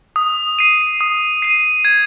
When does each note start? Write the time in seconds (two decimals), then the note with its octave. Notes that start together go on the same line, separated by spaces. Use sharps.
0.16 D#6
0.59 C7 D#7
1.01 D#6
1.42 C7 D#7
1.85 G#6